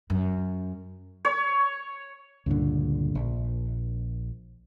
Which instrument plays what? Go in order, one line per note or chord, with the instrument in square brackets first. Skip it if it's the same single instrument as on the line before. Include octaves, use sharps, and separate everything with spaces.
[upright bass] F#2
[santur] C#5
[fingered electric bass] C#2 G2 A#2 D3
A#1